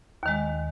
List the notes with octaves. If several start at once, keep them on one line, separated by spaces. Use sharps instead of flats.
D#2 D#3 G#3